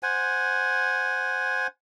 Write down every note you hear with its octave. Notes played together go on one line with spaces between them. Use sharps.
C5 F#5 G#5